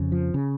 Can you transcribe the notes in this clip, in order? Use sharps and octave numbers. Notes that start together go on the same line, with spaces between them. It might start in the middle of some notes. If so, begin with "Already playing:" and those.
Already playing: F2 C#3
F3
C#3